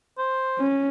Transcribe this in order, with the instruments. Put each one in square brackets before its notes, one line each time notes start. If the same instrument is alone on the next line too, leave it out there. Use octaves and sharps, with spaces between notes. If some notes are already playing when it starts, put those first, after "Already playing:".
[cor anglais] C5
[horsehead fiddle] C#4